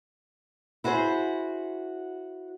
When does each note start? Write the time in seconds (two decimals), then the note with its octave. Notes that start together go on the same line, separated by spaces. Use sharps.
0.84 E4 F#4 G#4 A#4 C5